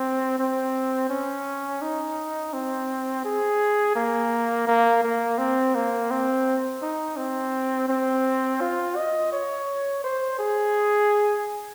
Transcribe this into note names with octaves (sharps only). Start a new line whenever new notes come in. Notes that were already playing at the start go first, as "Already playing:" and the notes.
Already playing: C4
C4
C#4
D#4
C4
G#4
A#3
A#3
A#3
C4
A#3
C4
D#4
C4
C4
F4
D#5
C#5
C5
G#4